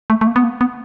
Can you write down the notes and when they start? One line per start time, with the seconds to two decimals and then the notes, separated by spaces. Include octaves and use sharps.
0.10 A3
0.21 A3
0.27 A#3
0.36 B3
0.44 A#3
0.61 B3